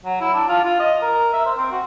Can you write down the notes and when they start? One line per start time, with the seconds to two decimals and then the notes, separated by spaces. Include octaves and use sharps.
0.05 F#3
0.21 E4
0.33 D4
0.48 F4
0.64 F4
0.79 D#5
1.01 A#4
1.33 E5
1.46 C5
1.57 C4
1.72 F#4